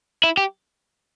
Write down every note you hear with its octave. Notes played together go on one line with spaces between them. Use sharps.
E4
G4